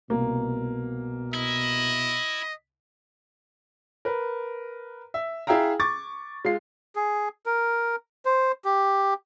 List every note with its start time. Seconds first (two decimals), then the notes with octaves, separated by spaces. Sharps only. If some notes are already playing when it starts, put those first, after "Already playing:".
0.10 C2 B2 A#3
1.34 E4 D#5
4.05 A#4 B4
5.14 E5
5.47 E4 G#4 E5 F5 G5 A#5
5.80 C#6 D6 A6
6.45 G#3 F4 C7
6.95 G#4
7.46 A#4
8.25 C5
8.65 G4